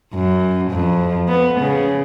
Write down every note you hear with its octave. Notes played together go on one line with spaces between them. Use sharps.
F#2
F2
B3
C#3